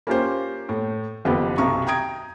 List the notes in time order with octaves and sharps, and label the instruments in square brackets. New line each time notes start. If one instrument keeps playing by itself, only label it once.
[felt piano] A#3 C#4 F4 G4 C5
A2
F#1 F2 B3 G4 B4
B1 C3 A#5 C#6
G5 A#5 D#6 G#6 D7